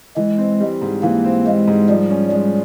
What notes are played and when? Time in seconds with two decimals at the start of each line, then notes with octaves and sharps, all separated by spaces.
0.17 E3 G#3
0.38 C4
0.60 G3
0.82 G#2
1.03 E3 A#3
1.25 C4
1.46 G3 G#3
1.68 G#2
1.89 F3 G3
2.10 C#4
2.31 G3 G#3